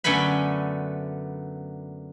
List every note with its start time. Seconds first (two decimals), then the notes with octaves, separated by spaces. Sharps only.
0.04 F#2 D3 A3 B3 G#5 B5